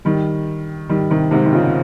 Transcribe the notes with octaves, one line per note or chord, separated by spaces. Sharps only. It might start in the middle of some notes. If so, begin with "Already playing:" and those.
D#3 G3
D#3 G3
C3 D#3
G#2 C3
D#3
A#2 C#3